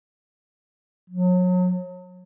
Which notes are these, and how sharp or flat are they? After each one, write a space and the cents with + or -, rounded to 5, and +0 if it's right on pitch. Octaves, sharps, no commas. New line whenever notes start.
F#3 -35